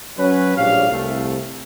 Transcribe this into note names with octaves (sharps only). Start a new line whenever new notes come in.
F#3 C#4 B4
A#1 A2 G3 C#5 F5
C2 A3